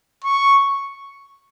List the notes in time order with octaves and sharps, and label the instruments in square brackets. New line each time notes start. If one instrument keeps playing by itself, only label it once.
[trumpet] C#6